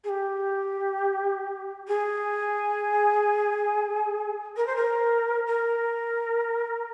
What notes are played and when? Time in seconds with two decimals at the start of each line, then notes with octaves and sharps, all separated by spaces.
0.04 G#4
0.09 G4
1.88 G#4
4.57 A#4
4.67 C5
4.76 A#4
5.47 A#4